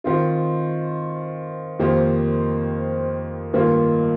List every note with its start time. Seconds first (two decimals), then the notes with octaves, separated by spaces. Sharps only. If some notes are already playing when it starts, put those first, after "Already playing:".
0.04 D#3 C4 F4
1.79 F2 D#3 A#3 G4 C5
3.53 G2 D#3 A#3 F4